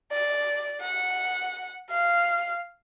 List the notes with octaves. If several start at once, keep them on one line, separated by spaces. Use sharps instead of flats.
D5
F#5
F5